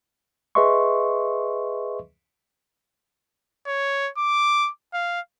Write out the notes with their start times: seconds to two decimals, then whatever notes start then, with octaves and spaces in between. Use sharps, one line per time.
0.55 G#4 B4 D#5 E5 C6 C#6
3.67 C#5
4.18 D6
4.93 F5